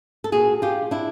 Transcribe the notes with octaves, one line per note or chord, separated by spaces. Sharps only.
A4
A#2 F#4 G#4
F4 G4
D4 E4